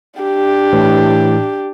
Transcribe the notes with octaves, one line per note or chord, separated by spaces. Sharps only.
D4 G4
A2 E3